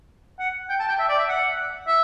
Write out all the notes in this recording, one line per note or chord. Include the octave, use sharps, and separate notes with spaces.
F#5
G5
A5
G5
E5
D5
E5
F#5
E5